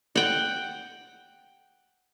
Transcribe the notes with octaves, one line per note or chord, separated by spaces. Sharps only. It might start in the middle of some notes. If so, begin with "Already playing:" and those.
F#5 G5